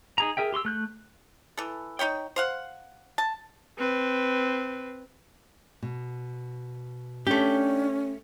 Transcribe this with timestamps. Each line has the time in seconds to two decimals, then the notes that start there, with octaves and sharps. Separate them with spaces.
0.18 D#4 G#4 A#5
0.37 G#4 A#4 E5 G5
0.52 G4 C6 C#6 E6
0.65 A3 F#6 G6
1.57 E3 A4
1.99 D#4 E4 C#5 G5
2.36 C5 F5 F#5
3.18 A5
3.78 C4 B4
5.82 B2
7.27 A3 C#4 D4 G4 G5